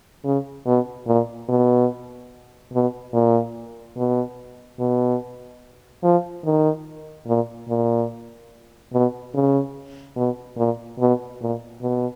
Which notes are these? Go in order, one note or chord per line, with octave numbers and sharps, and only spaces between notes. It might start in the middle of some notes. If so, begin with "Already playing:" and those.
C#3
B2
A#2
B2
B2
A#2
B2
B2
F3
D#3
A#2
A#2
B2
C#3
B2
A#2
B2
A#2
B2